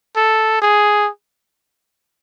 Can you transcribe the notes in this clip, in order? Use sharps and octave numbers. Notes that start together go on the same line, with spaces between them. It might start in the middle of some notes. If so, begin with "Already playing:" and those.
A4
G#4